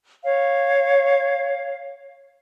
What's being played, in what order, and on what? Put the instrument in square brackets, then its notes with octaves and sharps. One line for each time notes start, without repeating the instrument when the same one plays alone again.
[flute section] C#5 F5